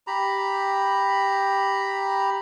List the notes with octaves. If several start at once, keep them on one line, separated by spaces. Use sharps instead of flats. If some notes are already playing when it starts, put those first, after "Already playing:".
G4 A#5 B5